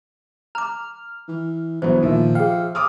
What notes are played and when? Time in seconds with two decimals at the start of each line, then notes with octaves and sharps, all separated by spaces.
0.55 A#5 D6 F6
1.28 E3
1.82 G1 E3 F#3 B3 C5
2.03 A#2 D#3 F3 E5
2.35 G#4 F5 G5
2.75 D6 D#6 F6